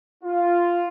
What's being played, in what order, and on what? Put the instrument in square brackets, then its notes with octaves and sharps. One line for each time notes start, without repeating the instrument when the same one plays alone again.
[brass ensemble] F4